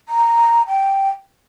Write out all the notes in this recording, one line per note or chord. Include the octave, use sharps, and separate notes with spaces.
A#5
G5